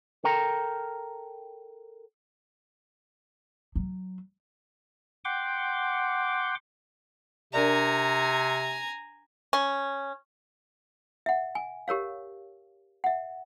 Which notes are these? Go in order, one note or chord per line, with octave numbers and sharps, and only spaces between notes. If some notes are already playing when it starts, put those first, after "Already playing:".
A4 A#4 G5 A#5
F#3
F#5 G5 C6 D6
C3 D4 A#4 D5 G#5 A#5
C#4
E5 F#5
G#5
G4 A#4 C#5 F5
E5 F#5